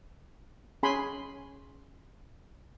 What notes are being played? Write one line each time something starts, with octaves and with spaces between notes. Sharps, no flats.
C#4 G#4 G#5 B5 C6